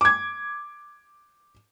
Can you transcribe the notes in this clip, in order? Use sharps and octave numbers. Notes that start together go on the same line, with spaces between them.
D6 G#6